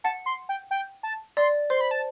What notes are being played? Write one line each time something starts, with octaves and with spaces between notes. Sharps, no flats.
F#5 A5
C6
G5
G5
A5
D5 C6
C5 C6
B5
A5